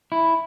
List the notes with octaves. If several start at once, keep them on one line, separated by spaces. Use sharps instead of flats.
E4